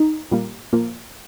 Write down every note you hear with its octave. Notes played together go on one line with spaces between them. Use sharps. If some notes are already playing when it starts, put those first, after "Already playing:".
Already playing: D#4
A#2 G3 A#3
A#2 F3 A#3